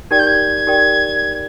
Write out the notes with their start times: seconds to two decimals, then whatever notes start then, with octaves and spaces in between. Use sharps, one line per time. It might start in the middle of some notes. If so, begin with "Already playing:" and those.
0.11 D#4 G4 A#4 D5 G5 G#6
0.19 G6
0.27 G#6
0.67 D#4 G4 A#4 D5 G5